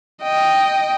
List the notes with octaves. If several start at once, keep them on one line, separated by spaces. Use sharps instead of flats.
D#5 G5